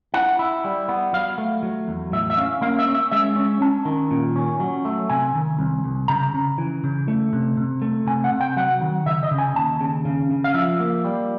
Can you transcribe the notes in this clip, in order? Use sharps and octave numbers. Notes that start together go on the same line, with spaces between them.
E4 F#5
E4
G3
B3
F#3 F5
A3
F#3
E2
A2 E5
E5
C#4 F5
A#3 F5
E5
C#4
E5
G#3 E5
C#4
C#4 A5
D#3
A#2
C#4
F#3
A3
C3 G#5
D#3
C2
C2
C#3 A#5
C#3
E3
C#3
A3
C3
C3
A3
C3 G#5
F#5
C3
G5
F#3 F#5
D#3
C#3 E5
D#5
C#3
G#5
D#2 A5
C#3
C#3
C#3
F5
F3 E5
A#3
G3